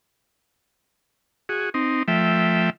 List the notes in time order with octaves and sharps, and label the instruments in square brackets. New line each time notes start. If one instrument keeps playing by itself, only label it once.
[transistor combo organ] F#4 G#4
C4 D#4
F3 A3 E5 G5